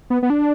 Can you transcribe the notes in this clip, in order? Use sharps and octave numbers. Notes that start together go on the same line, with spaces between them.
B3
B3
D4